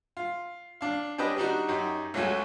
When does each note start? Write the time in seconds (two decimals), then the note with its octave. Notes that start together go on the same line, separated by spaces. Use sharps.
0.17 F4
0.81 D4 F5
1.18 C#4 D4 G4 B4 D#5
1.37 G3 D4 D#4 F#4
1.68 F#2 D#4 G4
2.14 C#2 F#3 A3 F#4 G#5